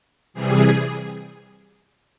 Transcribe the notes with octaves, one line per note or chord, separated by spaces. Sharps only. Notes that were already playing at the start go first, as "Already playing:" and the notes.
C3 E3 G3 G#4